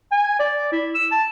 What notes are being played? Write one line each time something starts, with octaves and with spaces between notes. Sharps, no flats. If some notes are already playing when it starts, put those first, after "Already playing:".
G#5
D5
E4
E6
A5